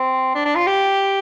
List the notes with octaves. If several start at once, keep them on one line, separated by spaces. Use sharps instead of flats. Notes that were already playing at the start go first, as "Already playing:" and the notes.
Already playing: C4
D4
D4
F4
G4